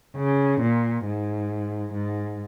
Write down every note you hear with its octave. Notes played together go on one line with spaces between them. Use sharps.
C#3
A#2
G#2
G#2